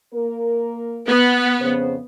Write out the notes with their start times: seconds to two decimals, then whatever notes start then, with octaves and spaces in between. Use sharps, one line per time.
0.13 A#3 A#4
1.07 B3
1.59 F2 C#3 C5